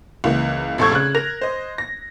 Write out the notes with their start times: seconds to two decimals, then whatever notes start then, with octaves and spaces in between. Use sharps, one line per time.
0.24 C#2 E3 A#3
0.78 F1 A#1 A4 C#6 G#6
0.91 C#3 F#6
1.15 A#4 A#6 F7
1.41 C5 D#5
1.78 A#6